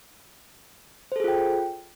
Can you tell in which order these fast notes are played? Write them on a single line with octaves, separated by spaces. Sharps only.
C5 A4 G#4 F4 G5